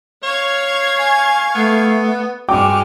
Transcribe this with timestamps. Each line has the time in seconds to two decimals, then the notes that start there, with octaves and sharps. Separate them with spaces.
0.23 C#5 F5 C#6 G#6
0.98 G#5
1.55 A3 B3
2.49 G2 G#3 F#4 G5 D6 F6